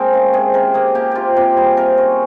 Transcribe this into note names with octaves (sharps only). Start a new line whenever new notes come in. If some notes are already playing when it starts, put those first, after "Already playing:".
Already playing: G#3 A#3 C4 G#4 A#4
C#3
C3 G#4
C3 A#4
A#3 G#4
A#3 G4
C3 F4 G4
C3 F4
G3 G#4
C3 A#4
C#4 C5